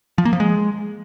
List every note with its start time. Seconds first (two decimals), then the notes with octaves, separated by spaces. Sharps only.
0.18 F3
0.25 A#3
0.33 F3
0.40 G#3